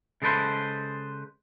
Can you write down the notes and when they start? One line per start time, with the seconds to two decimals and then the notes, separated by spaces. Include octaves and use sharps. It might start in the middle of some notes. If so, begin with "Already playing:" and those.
0.22 C#3 G#3 A4 B4 C5